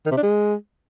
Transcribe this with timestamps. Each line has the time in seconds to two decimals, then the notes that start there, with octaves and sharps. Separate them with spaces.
0.06 D#3
0.11 C3
0.17 D4
0.23 G#3